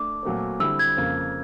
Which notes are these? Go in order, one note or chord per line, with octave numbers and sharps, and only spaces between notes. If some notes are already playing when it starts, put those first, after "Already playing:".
Already playing: A3 D4 D6
A#2 F#3 A3 C4
D3 G3 C4 E4 E6
G#6
F2 C#3 F3 A#3